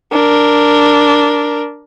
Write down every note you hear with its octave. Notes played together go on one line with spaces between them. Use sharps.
D4 A#4